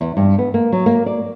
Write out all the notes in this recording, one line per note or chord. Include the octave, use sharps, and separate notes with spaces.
E2
G2
B3
A#3
F#3
A#3
D5